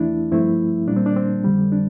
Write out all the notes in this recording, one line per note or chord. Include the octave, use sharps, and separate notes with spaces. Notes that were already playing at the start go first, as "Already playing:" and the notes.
Already playing: E2 E3 A3 D4 E4
G2 F3 A3 C4 E4
A#2 G3 A#3 D4
C4
D4
C4
F2 D3 G3
D4